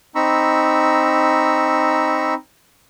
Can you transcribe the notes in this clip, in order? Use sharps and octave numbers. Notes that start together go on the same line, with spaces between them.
C4 D#4 A#5 B5 C#6 E6